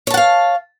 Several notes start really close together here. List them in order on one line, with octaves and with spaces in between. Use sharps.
C#5 A5 F#5 F5